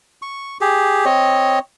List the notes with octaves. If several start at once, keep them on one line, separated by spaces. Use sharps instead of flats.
C#6
G4 G#4
C4 C#5 D#5